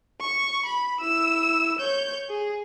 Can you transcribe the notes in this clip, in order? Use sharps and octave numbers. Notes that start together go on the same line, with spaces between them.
C#6
B5
E4 E6
C#5 G6
G#4